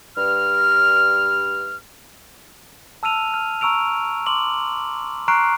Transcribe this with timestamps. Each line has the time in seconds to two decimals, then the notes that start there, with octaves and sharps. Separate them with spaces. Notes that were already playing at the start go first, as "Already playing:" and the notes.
0.17 G2 F6
3.03 A5 E6 F6 D#7 F7
3.34 F6
3.61 A#5 C#6 E6 D7 F7
4.27 C6 D6 F#7
5.28 A#5 C#6 F6 F#6 C7 D7